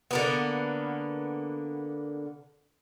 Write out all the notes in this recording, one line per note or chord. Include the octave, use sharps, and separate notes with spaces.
D3 A#3 B3